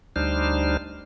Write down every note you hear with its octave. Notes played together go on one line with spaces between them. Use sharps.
D2 G3 D4 D#4 C5 F6